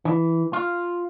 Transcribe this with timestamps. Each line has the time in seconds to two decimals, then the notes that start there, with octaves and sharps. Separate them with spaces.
0.05 E3
0.53 F4